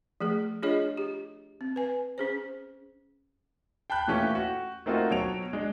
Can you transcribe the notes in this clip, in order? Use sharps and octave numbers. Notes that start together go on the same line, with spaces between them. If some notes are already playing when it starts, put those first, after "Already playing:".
F3 A3 G#4
D4 F4 G#4 C#5 D#5
G4
C4
B4 G#5
C#4 G#4 C5
G5 A5 B5 F#6 G6
A#2 E3 A3 C#4 G4
F#4
A3 A#3 C4 D#4 F4 F#4
B2 F#3 C#5 D7 F7
G#3 D4